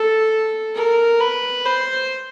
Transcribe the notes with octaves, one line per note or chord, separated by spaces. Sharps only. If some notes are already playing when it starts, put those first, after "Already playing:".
Already playing: A4
A#4
B4
C5